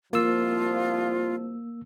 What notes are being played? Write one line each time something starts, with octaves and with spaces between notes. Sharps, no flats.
C2 F3 A#3 F4 E6